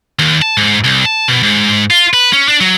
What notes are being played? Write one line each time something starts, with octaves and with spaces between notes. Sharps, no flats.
D#2
A5
G#2
C2
A5
B2
G#2
F4
B4
C#4
D4
F#3